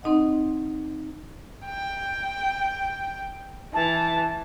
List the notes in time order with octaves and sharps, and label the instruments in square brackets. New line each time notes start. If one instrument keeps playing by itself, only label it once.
[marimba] C4 D#4 D#5 F#5
[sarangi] G5
[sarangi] E3 [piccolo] A5